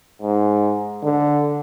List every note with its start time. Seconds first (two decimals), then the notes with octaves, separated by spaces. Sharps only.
0.22 G#2
1.03 D3